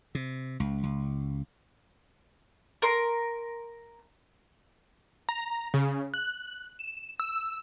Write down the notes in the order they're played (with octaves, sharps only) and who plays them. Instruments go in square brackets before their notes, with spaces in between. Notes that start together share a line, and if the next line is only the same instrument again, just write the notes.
[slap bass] C3
C#2
C#2
[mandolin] A#4 C6
[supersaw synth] A#5
C#3
F#6
E7
E6